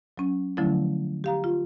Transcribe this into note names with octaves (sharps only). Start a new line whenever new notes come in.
F#3 C#4
D3 F3 F#3 A3 C#4 E4
G4 F5 A#5
F4